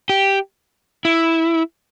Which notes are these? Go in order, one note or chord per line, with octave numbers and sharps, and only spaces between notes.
G4
E4